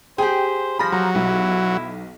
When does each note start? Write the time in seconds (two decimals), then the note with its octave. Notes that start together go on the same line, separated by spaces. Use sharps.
0.18 G4 G#4 C5 G5
0.79 F3 B5 A#6
0.92 F#3 A#5
1.15 B1 E4